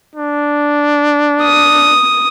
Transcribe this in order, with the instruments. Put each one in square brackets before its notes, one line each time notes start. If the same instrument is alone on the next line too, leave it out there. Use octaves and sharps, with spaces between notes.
[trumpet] D4
[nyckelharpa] D#6